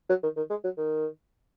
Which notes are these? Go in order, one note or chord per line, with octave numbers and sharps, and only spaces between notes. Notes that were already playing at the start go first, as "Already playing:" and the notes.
F#3
D#3
D#3
G#3
F#3
D#3